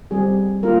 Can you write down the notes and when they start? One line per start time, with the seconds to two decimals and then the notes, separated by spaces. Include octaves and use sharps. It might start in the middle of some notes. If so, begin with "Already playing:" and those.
0.11 G3 C4 G4 G#4
0.63 A#3 F4 A#4